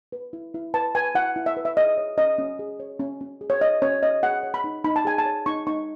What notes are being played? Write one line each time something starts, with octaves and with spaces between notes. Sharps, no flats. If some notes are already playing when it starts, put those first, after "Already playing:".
B4
E4
E4
B4 A5
B4 G#5
E4 F#5
E4
E5
B4
E5
G#4 D#5
C#5
C#4 D#5
C#4
G#4
C#5
C#4
C#4
G#4
C#5
C#5 D#5
C#4 C#5
C#4 D#5
G#4 F#5
C#5
B5
D#4
D#4 B5
A5
G#4 G#5
A5
C#5
D#4 C#6
D#4 C#6